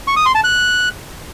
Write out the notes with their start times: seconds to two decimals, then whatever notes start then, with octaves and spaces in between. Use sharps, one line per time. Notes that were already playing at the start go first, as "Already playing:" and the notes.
0.07 C#6
0.17 D#6
0.26 C6
0.35 A5
0.44 F#6